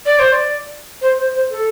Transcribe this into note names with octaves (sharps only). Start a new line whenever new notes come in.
D5
C5
D5
C5
C5
C5
A4